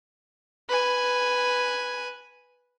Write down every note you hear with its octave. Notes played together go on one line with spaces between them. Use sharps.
B4 G#5